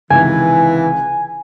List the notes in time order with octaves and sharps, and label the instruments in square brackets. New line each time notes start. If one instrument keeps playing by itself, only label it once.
[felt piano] C#2 C3 D#3 [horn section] E3 [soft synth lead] G#5